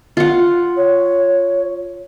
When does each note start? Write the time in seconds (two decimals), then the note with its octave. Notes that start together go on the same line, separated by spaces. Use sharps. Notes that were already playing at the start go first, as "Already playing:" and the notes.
0.17 F4 F#5
0.77 C#5